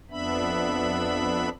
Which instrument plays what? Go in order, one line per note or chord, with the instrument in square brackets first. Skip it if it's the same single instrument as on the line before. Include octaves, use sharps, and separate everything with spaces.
[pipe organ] F2 B3 D4 E5 B5